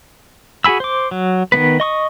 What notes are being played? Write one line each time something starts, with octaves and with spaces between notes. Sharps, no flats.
F#4 G#4 G#5 B5 E6
C5 D6
F#3
D#3 G3 B3 B4
D#5 C#6 D#6